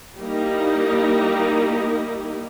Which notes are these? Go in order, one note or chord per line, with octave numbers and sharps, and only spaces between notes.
G3 A#3 D#4 E4